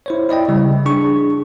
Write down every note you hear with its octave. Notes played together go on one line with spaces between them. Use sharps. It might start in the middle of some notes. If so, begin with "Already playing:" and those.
E4 C5 C#5
E4 D5 D#5 G5
C#3 G3
D4 G#4 C#6